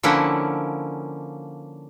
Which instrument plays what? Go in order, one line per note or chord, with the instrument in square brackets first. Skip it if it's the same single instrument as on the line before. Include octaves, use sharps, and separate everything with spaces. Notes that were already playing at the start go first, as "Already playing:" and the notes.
[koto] D3 F3 A#3 C#4 E4 F#5